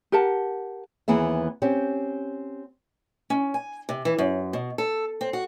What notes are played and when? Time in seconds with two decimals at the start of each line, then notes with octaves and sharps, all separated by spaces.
0.12 G4 A#4 F#5 A5
1.08 D#2 E3 B3 G#4 E5
1.62 C4 C#4 G4
3.30 C#4
3.54 G#5
3.89 C3
4.05 E3
4.18 F#2
4.53 B2
4.78 A4
5.21 C4
5.33 F#4